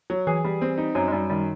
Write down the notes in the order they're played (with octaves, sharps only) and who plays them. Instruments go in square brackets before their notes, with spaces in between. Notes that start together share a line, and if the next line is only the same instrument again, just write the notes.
[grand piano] F#3
[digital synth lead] E3 [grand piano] G#4
[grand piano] G3
C4
D#4
[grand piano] F#2 [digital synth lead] F#3
[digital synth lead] G#3
[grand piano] F#2 [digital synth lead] G3
[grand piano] D#3 [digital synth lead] G3